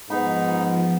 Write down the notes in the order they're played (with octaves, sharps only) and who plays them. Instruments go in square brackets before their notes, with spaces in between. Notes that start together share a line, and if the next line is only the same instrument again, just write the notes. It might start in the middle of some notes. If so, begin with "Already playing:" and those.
[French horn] G#2 [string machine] F3 [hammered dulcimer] B3 B5 [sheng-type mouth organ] D#4